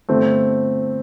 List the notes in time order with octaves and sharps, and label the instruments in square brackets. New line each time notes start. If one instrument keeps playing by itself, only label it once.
[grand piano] G1 A3 C4